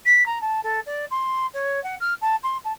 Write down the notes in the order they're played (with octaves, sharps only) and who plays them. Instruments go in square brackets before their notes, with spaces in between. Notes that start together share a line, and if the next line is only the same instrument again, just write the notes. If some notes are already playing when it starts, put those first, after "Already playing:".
[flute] B6
A#5
A5
A4
D5
C6
C#5
F#5
F6
A5
C6
A5